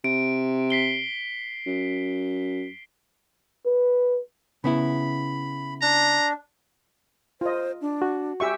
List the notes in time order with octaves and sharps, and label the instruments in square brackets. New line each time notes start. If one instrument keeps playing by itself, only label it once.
[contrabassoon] C3 [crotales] D7
[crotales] B6 C7 G7
[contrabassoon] F#2
[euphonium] B4
[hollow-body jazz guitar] C#3 B3 E4 [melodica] B5
[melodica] D4 [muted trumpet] A#5
[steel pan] F4 D#5 [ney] C5
[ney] D4
[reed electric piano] F#4
[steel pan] G4 E5 C#6 [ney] G#5